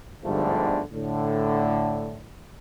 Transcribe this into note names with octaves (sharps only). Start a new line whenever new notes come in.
G1 G#2 D3 F3 G3 A3
A2 D3